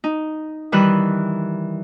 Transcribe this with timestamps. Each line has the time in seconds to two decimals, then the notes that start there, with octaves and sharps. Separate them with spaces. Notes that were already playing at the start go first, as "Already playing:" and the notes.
0.04 D#4
0.72 D#3 E3 G3 B4 F#6